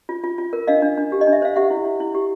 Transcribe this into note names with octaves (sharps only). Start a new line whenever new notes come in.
F4
F4
F4
A#4
D4 D#5 F5
D4
D4
G4
D#5
D4
E5
C5 F5
G4 E5 F#5
E4
E4
E4
G4